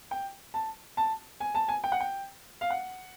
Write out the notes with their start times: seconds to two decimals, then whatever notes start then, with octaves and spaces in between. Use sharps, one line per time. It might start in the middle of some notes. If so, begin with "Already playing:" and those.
0.11 G5
0.54 A5
0.97 A5
1.40 G#5
1.55 A5
1.68 G#5
1.84 G5
1.92 F#5
2.00 G5
2.61 F5
2.70 F#5